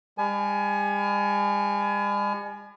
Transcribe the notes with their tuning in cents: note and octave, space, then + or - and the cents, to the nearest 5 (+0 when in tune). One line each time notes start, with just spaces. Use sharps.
G3 +45 G#5 +30